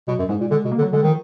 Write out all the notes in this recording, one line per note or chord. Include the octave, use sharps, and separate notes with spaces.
B2 F#3
F#2
G#2 G#3
A#2
D3 G#3
B2
A#3
D3
F#3
D3 G#3
D#3 F3